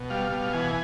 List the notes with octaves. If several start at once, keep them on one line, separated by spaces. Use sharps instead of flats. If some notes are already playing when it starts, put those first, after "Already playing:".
Already playing: B2
G3 F5
B2
E3 G#5